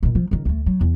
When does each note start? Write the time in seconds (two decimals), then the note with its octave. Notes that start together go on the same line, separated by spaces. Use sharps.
0.03 A#2 D#3
0.15 F3
0.31 C#2 D#3
0.45 D2 A3
0.66 F#3
0.81 E2